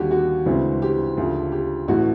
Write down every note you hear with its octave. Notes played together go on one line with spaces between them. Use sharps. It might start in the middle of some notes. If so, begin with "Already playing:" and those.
Already playing: D#2 D3 G3 F#4 G4
F#4
D2 C#3 E3 G#3 C4
G4
D2 C#3 F3
G4
A1 A2 E3 A3 F#4